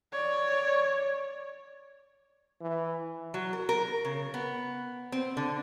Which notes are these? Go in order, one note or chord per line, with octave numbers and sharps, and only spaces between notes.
C#5 D5
E3
F#3
A#4
A#4
C#3
B3
C4
D3